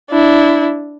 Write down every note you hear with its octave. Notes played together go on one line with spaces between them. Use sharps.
D4 E4